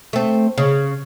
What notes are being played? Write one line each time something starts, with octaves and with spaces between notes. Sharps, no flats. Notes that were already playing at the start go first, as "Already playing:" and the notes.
A3 C4
C#3